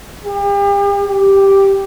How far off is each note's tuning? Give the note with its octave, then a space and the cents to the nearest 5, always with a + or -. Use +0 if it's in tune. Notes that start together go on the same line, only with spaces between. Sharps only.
G4 +40
G4 +0